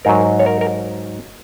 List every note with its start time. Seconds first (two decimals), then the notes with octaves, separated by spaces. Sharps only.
0.05 G#2 F#3 A#4
0.39 C#5
0.46 A#4
0.61 A#4